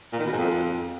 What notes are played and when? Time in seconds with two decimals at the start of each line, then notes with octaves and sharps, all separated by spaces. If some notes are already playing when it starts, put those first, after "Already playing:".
0.13 A#2
0.19 D#3
0.26 B2
0.32 G#2
0.39 F2